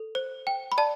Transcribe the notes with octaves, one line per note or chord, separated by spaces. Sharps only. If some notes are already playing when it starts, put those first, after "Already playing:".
Already playing: A4
C5
G5
B5
D5 A5